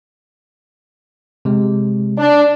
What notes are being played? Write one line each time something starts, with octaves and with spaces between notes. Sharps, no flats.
C3 G#3
D4